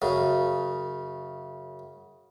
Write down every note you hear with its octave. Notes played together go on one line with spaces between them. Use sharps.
F#2 C#3